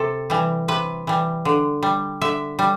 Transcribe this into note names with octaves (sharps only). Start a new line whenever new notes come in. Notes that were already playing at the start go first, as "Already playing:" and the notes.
Already playing: C3 A4
E3 G3
C3 B4
E3 G3
D3
G3
D3 E5
G3